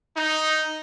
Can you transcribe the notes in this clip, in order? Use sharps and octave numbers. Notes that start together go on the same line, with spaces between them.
D#4